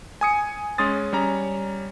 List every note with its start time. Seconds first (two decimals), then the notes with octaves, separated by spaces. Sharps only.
0.21 G#5 D#6 C#7
0.78 G#3 C#4 C6 D#6 A6
1.13 G3 C#4 A#5